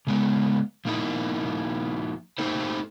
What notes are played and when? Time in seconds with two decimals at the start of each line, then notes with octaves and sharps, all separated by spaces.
0.07 C#3 G#3 B3
0.85 F3 A#3 D#4 E4
2.38 A3 A#3 D#4 G4 A4 C5